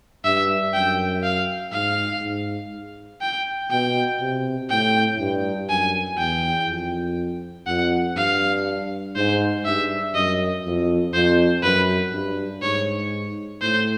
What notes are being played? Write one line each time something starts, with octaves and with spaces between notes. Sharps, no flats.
G2 E5
F#2 G5
F5
G#2 F5
G#2
G5
B2 G5
C3
A2 G5
G2
F#2 G#5
E2 G5
F2
F2 F#5
G2 F5
G#2 C5
G2 E5
F#2 D#5
F2
F2 C5
F#2 B4
G2
G#2 C#5
A2 C5